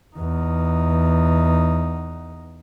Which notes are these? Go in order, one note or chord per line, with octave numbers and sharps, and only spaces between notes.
E2 D#4